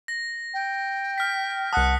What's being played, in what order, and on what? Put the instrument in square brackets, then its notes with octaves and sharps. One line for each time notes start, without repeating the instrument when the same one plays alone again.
[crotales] A#6
[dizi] G5
[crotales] F6 B6
[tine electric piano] C2 A5 [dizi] F#5 [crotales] D#6 F#6